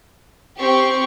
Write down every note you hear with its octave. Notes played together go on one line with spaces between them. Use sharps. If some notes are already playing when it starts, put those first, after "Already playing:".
C4 G4 G5 C#6